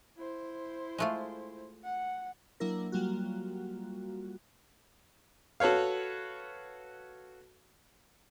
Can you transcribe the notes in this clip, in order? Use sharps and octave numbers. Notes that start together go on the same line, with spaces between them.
E4 C5
G#3 A3 F4
F#5
F#3 A#3 D4 E4 A#4
F#3 G3 A#3 F4 F#4
F#4 A4 B4 C#5 F5